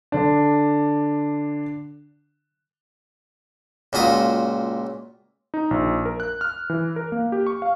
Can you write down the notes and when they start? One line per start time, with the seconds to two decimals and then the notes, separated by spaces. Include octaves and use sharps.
0.12 D3 D4
3.93 C#2 A#2 F#4 D#5
5.54 D#4
5.71 A#1
6.05 A#4
6.20 F#6
6.41 F6
6.70 E3
6.96 A#4
7.12 A#3
7.32 G4
7.47 C#6
7.62 F5